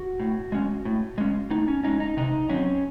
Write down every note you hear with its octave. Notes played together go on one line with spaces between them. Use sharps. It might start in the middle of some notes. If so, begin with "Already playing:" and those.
Already playing: F#4
A2
G#3 C#4
A2
G#3 C#4
A2 D#4
C#4
G#3 C#4 D#4
D#4
C3 D#4
F#3 C4 C#4